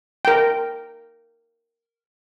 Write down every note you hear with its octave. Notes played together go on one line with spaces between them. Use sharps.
A#4 G5